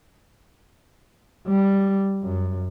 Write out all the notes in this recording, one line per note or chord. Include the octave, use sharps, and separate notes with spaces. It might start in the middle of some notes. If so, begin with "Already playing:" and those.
G3
F#2